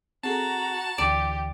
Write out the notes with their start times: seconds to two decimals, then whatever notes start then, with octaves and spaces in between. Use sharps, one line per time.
0.23 C4 F#4 G#4 A4 A5 A#5
0.98 D2 D3 E3 G4 D5